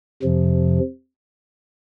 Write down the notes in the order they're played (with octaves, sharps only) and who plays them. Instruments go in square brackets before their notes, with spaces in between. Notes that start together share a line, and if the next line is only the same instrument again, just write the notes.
[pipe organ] F2 C3 F3